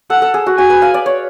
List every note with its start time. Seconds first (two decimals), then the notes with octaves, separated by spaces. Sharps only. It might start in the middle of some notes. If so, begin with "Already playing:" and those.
0.10 A4 F#5
0.22 A4
0.34 G#4
0.46 F#4
0.58 F#4 G#5
0.70 B4
0.82 F5
0.94 D5
1.06 C#5